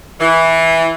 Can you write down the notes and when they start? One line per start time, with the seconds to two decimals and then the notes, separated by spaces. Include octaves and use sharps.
0.20 E3